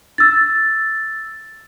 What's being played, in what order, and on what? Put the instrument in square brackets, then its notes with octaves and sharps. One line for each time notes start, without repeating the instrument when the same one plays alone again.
[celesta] E6 A6